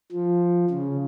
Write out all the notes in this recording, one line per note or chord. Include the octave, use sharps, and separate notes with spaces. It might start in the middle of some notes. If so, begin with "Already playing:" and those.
F3
C#3